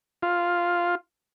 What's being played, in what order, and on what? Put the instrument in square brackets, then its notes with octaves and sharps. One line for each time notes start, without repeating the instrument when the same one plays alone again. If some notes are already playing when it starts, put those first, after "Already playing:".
[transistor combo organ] F4